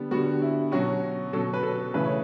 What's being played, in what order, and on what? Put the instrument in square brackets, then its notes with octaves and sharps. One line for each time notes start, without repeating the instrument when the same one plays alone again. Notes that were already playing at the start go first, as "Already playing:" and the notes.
Already playing: [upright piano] D3 G3 B3
D3 G3 B3 F#4
E4
B2 F#3 C#4 F#4
B2 F#3 C#4 A4
B4
A4
C#3 E3 A3 B4
C#5